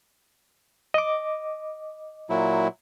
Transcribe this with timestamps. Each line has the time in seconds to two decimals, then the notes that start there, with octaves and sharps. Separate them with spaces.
0.94 D#5 D6
2.30 A#2 F#3 E4